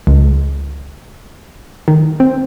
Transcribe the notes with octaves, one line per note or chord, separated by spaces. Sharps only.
C#2
D#3
C4